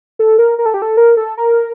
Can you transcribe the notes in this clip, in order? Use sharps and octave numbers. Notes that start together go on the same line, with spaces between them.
A4
A#4
A#4
A4
G4
A4
A#4
A4
A#4